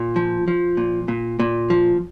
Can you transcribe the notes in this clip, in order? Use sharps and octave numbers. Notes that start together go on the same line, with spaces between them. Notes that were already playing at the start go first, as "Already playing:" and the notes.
Already playing: A#2
F3
F3
A#2
A#2
A#2
F3